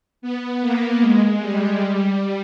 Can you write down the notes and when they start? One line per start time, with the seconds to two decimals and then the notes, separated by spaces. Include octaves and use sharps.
0.22 B3
0.61 A#3
1.01 G#3
1.40 G3
1.79 G3